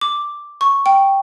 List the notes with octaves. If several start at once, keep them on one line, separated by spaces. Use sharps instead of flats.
D6
C#6
G5